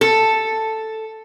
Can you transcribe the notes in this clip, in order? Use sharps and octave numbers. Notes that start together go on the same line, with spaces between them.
A4